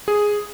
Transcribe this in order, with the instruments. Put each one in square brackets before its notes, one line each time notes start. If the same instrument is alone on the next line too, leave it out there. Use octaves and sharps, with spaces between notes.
[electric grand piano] G#4